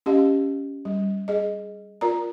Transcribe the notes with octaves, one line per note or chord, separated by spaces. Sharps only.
C#4 G4 D#5 F5
G3
G#4 D#5
F4 A#4 D5 A#5